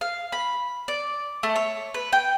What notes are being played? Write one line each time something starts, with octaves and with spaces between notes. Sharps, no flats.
F5
B5
D5
A3
C#5
B4
G5